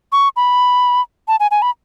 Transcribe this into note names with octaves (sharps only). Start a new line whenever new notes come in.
C#6
B5
A5
G#5
G#5
B5